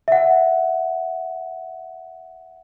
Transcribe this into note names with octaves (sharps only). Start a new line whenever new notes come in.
E5 F#5